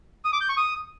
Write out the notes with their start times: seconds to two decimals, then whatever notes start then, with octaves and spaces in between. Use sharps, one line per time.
0.25 D#6
0.33 D6
0.41 G6
0.49 C#6
0.57 D#6